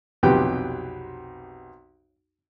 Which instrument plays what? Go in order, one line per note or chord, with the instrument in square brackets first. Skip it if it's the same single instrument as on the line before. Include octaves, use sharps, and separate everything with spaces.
[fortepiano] B1 F2 C3 G4 B4 G5